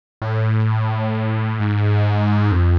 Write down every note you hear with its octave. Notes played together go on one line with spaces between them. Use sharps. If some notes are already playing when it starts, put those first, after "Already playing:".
A2
G#2
F2